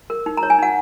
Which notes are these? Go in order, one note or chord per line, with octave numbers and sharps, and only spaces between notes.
A#4
D#4
A#5
C#5
G#5
D#4 F#5